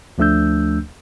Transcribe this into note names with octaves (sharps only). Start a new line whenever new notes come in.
D2 F3 A3 D4 E6 G6